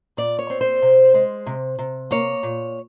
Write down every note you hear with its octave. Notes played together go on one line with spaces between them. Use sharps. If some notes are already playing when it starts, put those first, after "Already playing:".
A#2 D5
C#5
C4
C5
C3
G#3
C3
C3
A#3 C#5
A#2